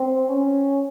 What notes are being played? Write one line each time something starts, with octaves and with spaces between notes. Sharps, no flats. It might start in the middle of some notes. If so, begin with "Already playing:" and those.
Already playing: C4
C#4